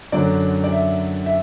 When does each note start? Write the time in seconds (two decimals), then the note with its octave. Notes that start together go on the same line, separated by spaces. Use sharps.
0.12 F#2 D3 F#3 D5
0.64 D5
0.72 E5
1.26 E5